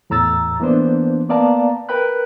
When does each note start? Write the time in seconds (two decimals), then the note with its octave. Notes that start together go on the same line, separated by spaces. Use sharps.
0.10 E2 A2 A#5 E6 A6
0.60 E3 A#3 B3 D4 C5
1.29 A#3 B3 D5 F5 A5 A#5
1.89 A#4 B4 G5 B5 F#6